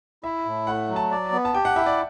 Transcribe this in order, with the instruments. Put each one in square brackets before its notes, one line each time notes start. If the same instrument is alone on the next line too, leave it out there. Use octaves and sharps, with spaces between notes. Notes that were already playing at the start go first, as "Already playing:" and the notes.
[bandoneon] E4 [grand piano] E5
[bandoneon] A2
[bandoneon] A3 [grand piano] F#5
[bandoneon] F#3
[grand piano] A5
[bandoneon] D5
B3
[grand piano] A5
[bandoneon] G4 [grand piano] G5
[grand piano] F#5
[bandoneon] E4 [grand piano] E5
[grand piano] D5